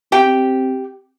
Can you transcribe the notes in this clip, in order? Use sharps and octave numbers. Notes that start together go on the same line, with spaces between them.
C4 G4 G5